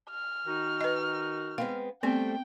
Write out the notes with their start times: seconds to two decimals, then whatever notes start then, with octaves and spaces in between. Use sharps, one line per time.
0.11 F6
0.47 D#3 D#4 F#4
0.81 B4 D#5
1.58 G#3 B3 C4 F5
2.03 G3 A3 B3 C4 C5 G5